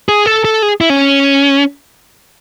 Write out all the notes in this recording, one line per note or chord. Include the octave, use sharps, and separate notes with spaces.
G#4
A4
A4
G#4
E4
C#4